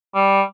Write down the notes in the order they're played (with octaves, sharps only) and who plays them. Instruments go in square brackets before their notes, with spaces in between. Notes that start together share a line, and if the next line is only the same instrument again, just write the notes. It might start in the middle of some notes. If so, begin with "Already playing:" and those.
[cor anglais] G3